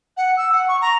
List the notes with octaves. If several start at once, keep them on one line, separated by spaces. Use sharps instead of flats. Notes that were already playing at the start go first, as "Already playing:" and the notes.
F#5
E6
F#5
C#6
A#5